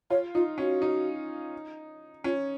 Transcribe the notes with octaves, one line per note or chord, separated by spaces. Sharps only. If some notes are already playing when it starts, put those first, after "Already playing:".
F4 C#5
D#4 F4
C#4 F#4
D#4
C#4 F4